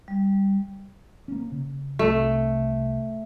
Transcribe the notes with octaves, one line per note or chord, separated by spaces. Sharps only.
G3
A#3 C#4
C#3
C2 A3